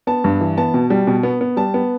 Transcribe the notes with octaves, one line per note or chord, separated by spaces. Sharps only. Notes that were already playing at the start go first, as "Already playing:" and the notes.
B3 A5
G2
E3
B3 A5
B2
G3
B2
B3
B3
G3 A5
B3